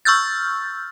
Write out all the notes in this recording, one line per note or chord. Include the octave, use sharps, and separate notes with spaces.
C#6 E6 F6 G6 A6